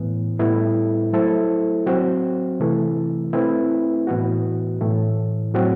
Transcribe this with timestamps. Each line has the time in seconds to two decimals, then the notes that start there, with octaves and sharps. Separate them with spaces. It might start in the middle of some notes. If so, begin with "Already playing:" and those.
Already playing: A2 E3 B3
0.39 A2 G3 B3 E4 A4
1.12 F#3 A3 E4 A4 C5
1.86 F#3 C4 F#4 C5
2.60 C3 E3 A3
3.33 A3 C4 E4 B4
4.07 A2 E3 B3 F#4
4.81 A2 E3 A3
5.54 A2 F#3 C4 F#4